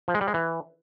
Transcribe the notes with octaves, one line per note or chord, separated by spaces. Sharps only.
F3
G#3
G3
G#3
E3